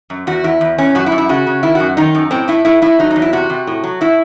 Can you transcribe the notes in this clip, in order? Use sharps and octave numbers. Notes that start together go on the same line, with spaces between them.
F#2
E2 F#4
E2 E4
E2
E2 C#4
F#2 F#4
E4
F#2
E4
C#3 F#4
C#3
D#3 E4
F#2 F#4
D#3 D#4
F#2
A2 C4
A2 E4
A2 E4
A2 E4
F#3 D#4
D#4
E2
E4
C3 F#4
C3
A2
F#3
A2 E4